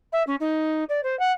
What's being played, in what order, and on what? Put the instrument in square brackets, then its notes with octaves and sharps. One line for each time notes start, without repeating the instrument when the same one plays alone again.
[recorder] E5
C#4
D#4
D5
C5
F#5